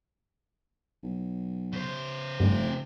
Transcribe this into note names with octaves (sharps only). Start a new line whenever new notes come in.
B1
C#3 C5
F1 G2 C4